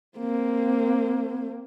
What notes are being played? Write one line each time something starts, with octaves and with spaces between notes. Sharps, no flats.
A#3 C4